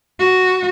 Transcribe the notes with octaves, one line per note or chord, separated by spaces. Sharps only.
F#4